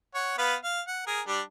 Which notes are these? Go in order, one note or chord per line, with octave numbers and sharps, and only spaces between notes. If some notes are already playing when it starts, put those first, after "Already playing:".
C#5 F#5
B3 B4 F5
F5
F#5
G#4 A#4
G3 D4